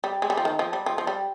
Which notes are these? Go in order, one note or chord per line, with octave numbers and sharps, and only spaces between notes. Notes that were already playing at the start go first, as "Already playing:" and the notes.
G3
G#3
G3
F3
D#3
F3
G3
F3
F3
G3